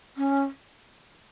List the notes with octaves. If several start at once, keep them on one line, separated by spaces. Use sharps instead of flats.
C#4